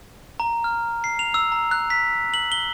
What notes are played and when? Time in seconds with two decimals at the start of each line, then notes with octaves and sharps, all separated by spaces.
0.40 A#5
0.64 F6
1.04 C7
1.19 F7
1.34 E6
1.52 A#5
1.71 F#6
1.90 B6
2.34 F#7
2.52 G7